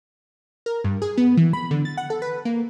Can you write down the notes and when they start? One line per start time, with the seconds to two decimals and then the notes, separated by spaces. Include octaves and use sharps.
0.66 A#4
0.84 G2
1.02 G#4
1.18 B3
1.37 E3
1.53 B5
1.71 D3
1.85 A6
1.97 F#5
2.10 A4
2.22 B4
2.45 A#3